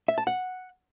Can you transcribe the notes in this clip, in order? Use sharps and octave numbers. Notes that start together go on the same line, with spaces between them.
E5
A5
F#5